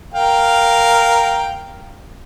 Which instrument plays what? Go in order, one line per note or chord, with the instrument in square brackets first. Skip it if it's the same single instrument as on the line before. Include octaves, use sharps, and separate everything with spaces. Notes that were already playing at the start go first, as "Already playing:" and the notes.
[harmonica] A#4 F5 G5